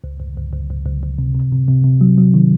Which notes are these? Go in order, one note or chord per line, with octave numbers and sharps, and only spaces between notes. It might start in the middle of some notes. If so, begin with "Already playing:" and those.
C#2
C#2
C#2
C#2
C#2
C#2
C#2
C3
C3
C3
C3
C3
F#3
F#3
D#3